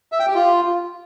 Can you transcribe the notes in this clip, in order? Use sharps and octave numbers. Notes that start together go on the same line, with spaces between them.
E5
G5
G4
F4